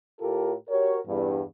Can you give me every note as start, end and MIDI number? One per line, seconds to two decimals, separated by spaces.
0.20 0.53 45
0.20 0.53 65
0.20 0.53 67
0.20 0.53 69
0.20 0.53 70
0.69 0.98 66
0.69 0.98 67
0.69 0.98 70
0.69 0.98 73
1.07 1.42 40
1.07 1.42 43